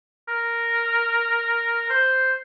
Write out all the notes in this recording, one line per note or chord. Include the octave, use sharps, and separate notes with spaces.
A#4
C5